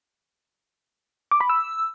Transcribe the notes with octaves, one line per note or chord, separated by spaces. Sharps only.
D6
B5
E6